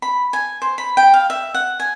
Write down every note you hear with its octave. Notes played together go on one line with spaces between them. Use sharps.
B5
G#5
C5
B5
G5
F5
E5
F#5
G#5